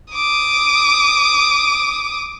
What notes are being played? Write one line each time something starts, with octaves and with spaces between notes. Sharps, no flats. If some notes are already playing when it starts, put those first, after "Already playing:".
D6 D#6